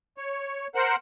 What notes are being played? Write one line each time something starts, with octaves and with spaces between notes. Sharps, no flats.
C#5
A#4 C5 F#5